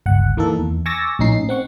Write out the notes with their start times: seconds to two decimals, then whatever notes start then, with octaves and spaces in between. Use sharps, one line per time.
0.06 G1 C#2 F#5
0.37 E3 A#3 D#4 A4
0.59 E2
0.86 G#5 C#6 D6 E6 A6 A#6
1.19 A#1 A2 C#4 D#4 C7
1.49 C4 F#5 C#6